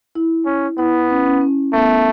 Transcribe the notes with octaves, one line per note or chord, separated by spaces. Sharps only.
E4
C#4
B3 E4
C#4
C#4
C#4
A3 B3